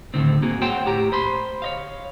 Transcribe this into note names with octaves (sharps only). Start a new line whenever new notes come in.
D2 A2 D3 D#3 C4
A#3 F#4 G#4
C5 C#5 F#5 G5 A5 C6
A2 G4 A#5
C5 B5 C6
C#5 D#5 F5